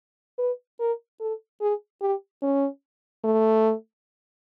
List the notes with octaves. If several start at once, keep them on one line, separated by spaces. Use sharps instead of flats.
B4
A#4
A4
G#4
G4
C#4
A3